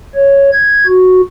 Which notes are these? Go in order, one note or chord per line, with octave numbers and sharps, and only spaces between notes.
C#5
G#6
F#4